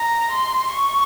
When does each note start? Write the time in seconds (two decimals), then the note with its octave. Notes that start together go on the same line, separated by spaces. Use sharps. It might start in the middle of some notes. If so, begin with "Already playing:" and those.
Already playing: A#5
0.32 C6
0.73 C#6